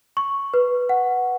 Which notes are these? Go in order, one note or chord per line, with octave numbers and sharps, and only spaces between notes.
C#6
B4
F#5